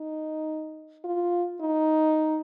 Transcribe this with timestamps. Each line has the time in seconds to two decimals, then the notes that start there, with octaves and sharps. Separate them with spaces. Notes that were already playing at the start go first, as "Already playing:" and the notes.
Already playing: D#4
1.04 F4
1.61 D#4